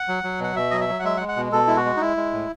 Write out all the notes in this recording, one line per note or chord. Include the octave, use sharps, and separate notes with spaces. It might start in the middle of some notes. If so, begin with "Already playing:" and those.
Already playing: F#5
F#3
F#3
B2 F#5
B2 E5
F#3 D#5
E5
F#3
F#5
G#3 E5
F#5
G#3
F#5
B2
B2 A4
G#3 E4
F#4
G#3
D#4
G#3 E4
G#3
A2